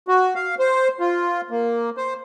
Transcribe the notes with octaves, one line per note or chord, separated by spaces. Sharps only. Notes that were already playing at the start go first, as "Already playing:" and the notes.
F#4
F5
C5
F4
A#3
C5